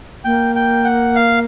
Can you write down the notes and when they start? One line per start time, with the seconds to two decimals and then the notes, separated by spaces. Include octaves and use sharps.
0.24 A#3 G5
0.56 G5
0.85 F#5
1.16 F5